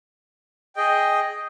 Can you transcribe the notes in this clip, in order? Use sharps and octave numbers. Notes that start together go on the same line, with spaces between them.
G#4 D#5 G5